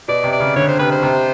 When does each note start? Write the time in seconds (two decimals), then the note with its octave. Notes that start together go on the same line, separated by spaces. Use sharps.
0.08 B2 D5
0.24 C3
0.32 D5
0.40 C#3
0.56 D3 C#5
0.68 C5
0.79 C3 B4
0.92 C5
1.03 C3